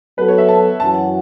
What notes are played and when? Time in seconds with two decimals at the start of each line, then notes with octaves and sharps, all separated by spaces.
0.18 F#3 B3 F#4 A4 B4
0.28 C#5
0.38 E5
0.48 A5
0.80 F#2 E3 C#4 F#4 A5